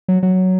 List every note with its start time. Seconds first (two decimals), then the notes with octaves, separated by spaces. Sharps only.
0.08 F#3
0.23 F#3